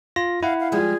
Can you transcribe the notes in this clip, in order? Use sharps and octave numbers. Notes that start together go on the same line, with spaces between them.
F4 A#6
E4 F5 F#5
F5
F3 G3 G#3 G#4